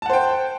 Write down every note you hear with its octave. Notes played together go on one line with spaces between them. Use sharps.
C5 F#5 G5 A5